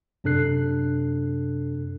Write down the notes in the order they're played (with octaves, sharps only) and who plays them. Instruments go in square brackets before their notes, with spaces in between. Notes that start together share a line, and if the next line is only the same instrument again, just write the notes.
[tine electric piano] F#2 C3 D4 A4 F#6 C7